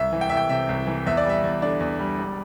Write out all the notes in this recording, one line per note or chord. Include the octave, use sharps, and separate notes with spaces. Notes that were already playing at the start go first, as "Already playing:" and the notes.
Already playing: C2 E5
E3
G5
C2 E5
G5
C3 E5
C2
E3
E2 E5
D5
G3 E5
E2
D3 D5
E2
G3
E1